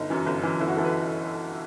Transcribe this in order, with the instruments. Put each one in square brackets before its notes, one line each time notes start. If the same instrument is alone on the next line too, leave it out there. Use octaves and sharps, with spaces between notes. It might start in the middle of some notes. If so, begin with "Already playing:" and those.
Already playing: [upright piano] G1 D#4
F#2 E3
G1
F#2 E3
G1 E4
F#4
F#2 E3 A4
B4